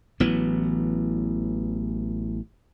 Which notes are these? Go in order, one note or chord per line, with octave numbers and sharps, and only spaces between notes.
A1 E3 F#3 B3